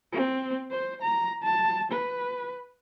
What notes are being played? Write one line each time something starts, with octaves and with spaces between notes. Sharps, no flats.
C4
C5
A#5
A5
B4